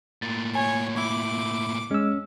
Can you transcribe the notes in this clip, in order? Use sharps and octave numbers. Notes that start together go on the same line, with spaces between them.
A2 A#3 A6
C#5 G#5
E4 D6
G#3 C#4 E6